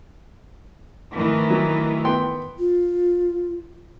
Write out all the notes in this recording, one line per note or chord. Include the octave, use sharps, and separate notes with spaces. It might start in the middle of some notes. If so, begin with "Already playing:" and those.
D#3 E3 A3
F#3
B3 G5 C6
F4